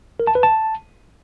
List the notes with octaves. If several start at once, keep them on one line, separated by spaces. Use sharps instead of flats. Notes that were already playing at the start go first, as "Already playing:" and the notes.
A#4
A5
B4
A5